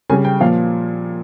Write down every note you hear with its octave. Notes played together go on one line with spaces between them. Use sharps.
C#3 G3 G#5
G5
A#2 F3 F5